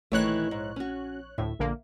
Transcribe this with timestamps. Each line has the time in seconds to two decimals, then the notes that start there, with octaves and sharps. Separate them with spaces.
0.12 A#1 D#3 E3 A3 C#5 F#6
0.51 G#2
0.76 C#4 F#4
1.38 D2 A2 E5
1.59 A#1 D3 A#3